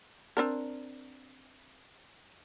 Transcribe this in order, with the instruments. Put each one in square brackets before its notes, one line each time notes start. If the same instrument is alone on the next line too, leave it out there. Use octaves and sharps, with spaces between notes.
[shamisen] C4 D4 A#4